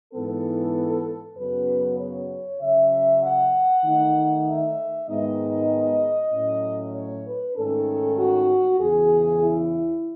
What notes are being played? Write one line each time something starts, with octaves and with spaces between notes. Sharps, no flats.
G#2 E3 B3 A4
F#2 C#3 F#3 B3 B4
C#5
C#3 F#3 C#4 E5
F#5
D#3 A3 D#4
E5
G#2 D#3 G#3 B3 D#4 D#5
A2 F#3 A3 C#4
C#5
B4
G#2 D#3 A3 C#4 A4
F#4
E2 C#3 E3 G#4
E4